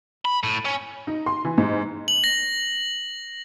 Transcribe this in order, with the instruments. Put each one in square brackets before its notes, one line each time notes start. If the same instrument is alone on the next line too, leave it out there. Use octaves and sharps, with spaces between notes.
[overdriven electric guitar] B5
A2
C#4
[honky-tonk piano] D#4
C6
E3
G#2
[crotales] F#7
A#6